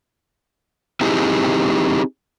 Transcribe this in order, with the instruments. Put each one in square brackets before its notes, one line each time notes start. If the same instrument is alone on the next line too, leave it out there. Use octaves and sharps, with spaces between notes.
[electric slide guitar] C4 D#4 E4 G4 G#4